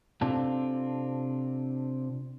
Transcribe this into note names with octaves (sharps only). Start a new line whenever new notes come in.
C3 C4 D4 F4 A4